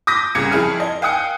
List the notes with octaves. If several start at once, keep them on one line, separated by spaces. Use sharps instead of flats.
D6 D#6 G6 A#6 B6
C2 C#3 G#6 C#7
F2 E4 G#4 F6
D#5
F5 G5 G#5 D#6 F#6 C#7